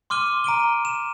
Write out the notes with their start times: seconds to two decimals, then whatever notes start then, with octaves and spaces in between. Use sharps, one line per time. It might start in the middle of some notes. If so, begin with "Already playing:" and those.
0.10 C6 D6 F6 D#7 G7
0.44 A#5 D7 D#7 G7
0.85 E7